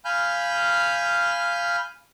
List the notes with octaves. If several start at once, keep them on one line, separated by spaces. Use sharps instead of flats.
F5 G#5 B5 F6 G6